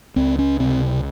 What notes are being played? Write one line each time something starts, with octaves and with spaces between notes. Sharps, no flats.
C#2 C4
C#4
C3 C4